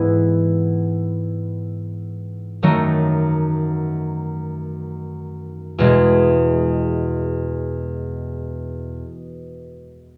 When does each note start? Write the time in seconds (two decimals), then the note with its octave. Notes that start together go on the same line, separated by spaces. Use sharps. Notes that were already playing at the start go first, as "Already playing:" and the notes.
Already playing: G#2 E3 B3 E4
2.62 F#2 D#3 F#3 A3 D#4
5.78 E2 B2 G#3